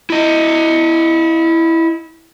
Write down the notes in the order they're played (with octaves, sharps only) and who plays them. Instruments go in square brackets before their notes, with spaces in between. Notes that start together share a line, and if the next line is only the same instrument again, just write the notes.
[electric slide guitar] E4 D#5